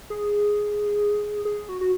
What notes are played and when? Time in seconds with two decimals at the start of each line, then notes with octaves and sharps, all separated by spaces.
0.10 G#4
1.45 G#4
1.69 F#4
1.81 F#4